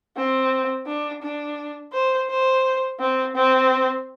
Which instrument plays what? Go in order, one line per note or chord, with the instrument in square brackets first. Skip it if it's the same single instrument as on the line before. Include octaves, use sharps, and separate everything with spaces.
[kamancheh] C4
D4
D4
C5
C5
C4
C4